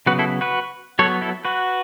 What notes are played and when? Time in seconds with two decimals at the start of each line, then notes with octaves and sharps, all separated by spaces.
0.06 C#3 F#3 B3 F#4 B4
0.19 E4 A4
0.41 F#4 B4
0.99 F#3 B3 A4 C#5
1.22 E4 A4
1.45 F#4 B4